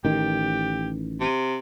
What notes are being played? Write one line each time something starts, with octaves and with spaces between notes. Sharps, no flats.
A1 D#3 G4
C3